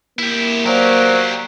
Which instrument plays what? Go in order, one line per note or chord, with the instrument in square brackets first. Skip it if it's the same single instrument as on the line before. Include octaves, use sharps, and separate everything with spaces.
[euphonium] A#3 [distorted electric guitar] E4 G4
[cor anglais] F#3 [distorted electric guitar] G4 A#4 [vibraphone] C5 D5 F5